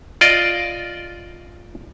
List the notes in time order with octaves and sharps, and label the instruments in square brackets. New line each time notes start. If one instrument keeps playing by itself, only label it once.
[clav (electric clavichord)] F4 D5 D#5